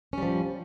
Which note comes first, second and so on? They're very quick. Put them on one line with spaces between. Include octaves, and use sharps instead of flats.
C#4 G3 F3